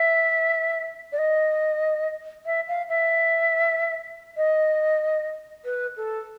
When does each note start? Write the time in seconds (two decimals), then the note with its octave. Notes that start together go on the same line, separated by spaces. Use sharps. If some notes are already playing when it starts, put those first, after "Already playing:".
Already playing: E5
1.12 D5
1.18 D#5
2.46 E5
2.68 F5
2.89 E5
4.37 D#5
5.65 B4
5.97 A4